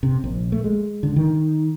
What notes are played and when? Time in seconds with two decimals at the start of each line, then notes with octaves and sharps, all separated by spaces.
0.03 C3
0.24 A#1
0.52 A3
0.64 G#3
1.03 D3
1.16 D#3